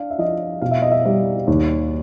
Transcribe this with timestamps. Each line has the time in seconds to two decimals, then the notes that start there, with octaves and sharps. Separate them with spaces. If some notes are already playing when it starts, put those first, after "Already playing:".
Already playing: D4 F5
0.11 E5
0.18 F3 D#5
0.61 B2 F5
0.71 E5
0.82 D#5
0.92 E5
1.05 G3
1.47 D#2